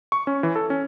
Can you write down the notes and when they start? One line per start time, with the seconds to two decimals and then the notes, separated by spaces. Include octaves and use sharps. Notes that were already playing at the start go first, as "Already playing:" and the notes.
0.12 C#6
0.27 C#4
0.43 E3
0.56 A4
0.70 C#4